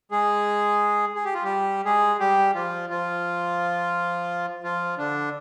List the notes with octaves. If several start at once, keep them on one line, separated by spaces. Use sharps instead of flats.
G#3 G#4
G#4
G4
F4
G3 G4
G#3 G#4
G3 G4
F3 F4
F3 F4
F3 F4
D3 D4